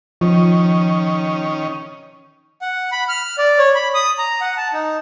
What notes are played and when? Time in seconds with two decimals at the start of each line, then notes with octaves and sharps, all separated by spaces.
0.21 D#3 F3 C#4
2.62 F#5
2.92 B5
3.09 F6
3.38 D5
3.59 C#5
3.75 B5
3.94 D#6
4.19 A#5
4.41 F#5
4.57 A5
4.73 D#4